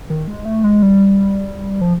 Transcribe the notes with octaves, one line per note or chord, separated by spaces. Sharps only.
D#3
G#3
A3
G#3
G3
F3